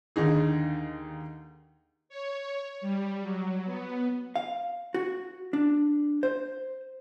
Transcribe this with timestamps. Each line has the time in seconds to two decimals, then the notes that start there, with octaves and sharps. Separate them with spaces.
0.16 D#2 D3 D#4 G#4
2.09 C#5
2.81 G3
3.22 F#3
3.66 B3
4.36 F5
4.94 F#4
5.53 D4
6.23 C5